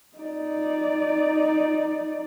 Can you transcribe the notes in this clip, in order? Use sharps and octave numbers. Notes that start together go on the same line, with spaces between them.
D#4 D5